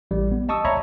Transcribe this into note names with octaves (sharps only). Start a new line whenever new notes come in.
A1 G3
B3
D#5 A5 C#6 D#6 E6
C#5 D5 E5 A#5 B5 C#6